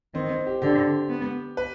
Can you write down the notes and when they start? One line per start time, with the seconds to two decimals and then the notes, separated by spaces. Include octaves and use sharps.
0.14 D#3 C4
0.30 C4
0.47 G4
0.62 D3 G4
1.09 B3
1.57 B4